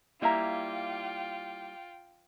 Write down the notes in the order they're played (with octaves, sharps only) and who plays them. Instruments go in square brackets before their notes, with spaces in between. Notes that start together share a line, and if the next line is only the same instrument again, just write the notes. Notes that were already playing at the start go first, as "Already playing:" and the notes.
[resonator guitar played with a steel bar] G3 A#3 E5 [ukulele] E4 A#5 [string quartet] F4 G5